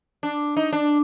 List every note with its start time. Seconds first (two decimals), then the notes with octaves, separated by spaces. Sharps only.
0.23 D4
0.57 D#4
0.73 D4